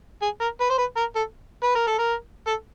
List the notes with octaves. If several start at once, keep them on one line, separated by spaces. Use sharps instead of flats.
G#4
A#4
B4
C5
B4
A#4
A4
B4
A#4
A4
A#4
A4